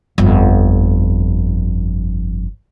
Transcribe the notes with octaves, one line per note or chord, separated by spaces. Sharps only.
G1 F2